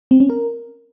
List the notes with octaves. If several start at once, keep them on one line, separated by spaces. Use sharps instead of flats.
C4
C#4
A#4